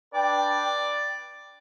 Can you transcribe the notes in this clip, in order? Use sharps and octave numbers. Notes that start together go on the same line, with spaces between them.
D4 B4 D5 G5